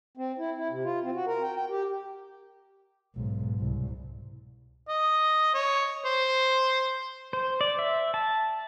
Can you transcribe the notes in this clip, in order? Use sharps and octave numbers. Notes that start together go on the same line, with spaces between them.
C4
E4
E4
C3
F4
C4
F#4
A#4
G5
G5
G4
B1 G#2
C2
D#5
C#5
C5
C5
D5
E5
A5